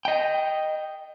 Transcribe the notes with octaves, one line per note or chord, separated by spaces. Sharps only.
D#5 G5